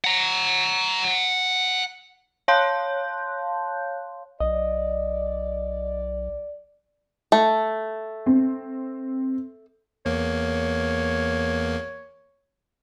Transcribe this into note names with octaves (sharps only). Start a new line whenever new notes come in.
F#5 A#5
C#5 F5 A5 C6 F#6 G6
B1 D5 D#5
A3
C4
E2 A#3 C#5